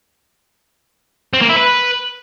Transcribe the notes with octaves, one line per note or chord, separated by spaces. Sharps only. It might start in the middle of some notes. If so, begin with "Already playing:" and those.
C4
A#3
E4
B4